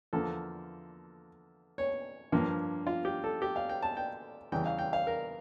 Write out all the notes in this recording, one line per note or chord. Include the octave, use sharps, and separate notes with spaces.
E2 D3 F3 A#3 A4
C#5
G2 F3 A#3
F4
G4
A4
G4
F5
G5
A5
G5
E2 C#3 E3 G3 G5
F5
G5
F5
A#4